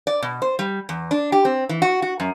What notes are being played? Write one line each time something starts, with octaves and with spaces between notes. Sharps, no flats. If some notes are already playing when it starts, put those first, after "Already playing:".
D5
B2
C5
G3
E2
D4
G4
C4
E3
F#4
F#4
F#2